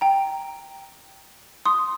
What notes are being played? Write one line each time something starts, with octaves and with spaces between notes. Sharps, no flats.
G5 A#5
C6 D#6